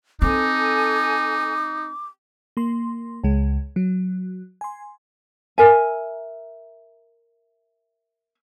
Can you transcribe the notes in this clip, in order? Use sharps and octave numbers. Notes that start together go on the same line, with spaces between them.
C4 D#4 A4 G#5 D6
A#3 C6
C#2 G#3
F#3
G#5 C6
A#4 E5 G#5